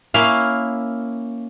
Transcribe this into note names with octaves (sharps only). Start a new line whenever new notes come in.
A#3 C#4 E4 F5